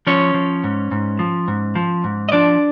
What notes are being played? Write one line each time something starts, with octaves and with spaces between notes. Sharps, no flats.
F3 C#4 C#5
F3
G#2
G#2
F3
G#2
F3
G#2
D#5
F3 D4 D5